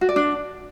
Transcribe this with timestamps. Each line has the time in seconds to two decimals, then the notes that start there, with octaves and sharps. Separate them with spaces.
0.01 F#4
0.09 D5
0.16 D4